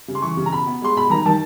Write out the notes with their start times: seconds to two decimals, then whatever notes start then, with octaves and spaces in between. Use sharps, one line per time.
0.08 C#3
0.15 C6
0.22 E3 C#6
0.37 C#3
0.46 A#5
0.52 B2 B5
0.67 B3
0.82 G#3 C6
0.97 B2 B5
1.10 D#3 A#5
1.26 D#3 A5